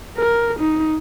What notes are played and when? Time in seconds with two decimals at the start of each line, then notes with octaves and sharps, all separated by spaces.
0.17 A#4
0.59 D#4